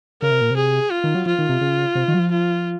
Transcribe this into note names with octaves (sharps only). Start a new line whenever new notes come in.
C#3 A#4
C3
A#2
C3
G#4
F4
D#3
F#3
F3 F4
D#3
C3
C#3
C3
D#3
F#3
F3
F4